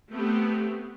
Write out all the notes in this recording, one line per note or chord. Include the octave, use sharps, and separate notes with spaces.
A3 B3 C4 G4